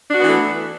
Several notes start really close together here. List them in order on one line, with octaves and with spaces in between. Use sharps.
D4 F#4 B3 E3 A3